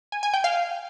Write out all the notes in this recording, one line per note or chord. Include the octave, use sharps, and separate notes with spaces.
G#5
G#5
G5
F5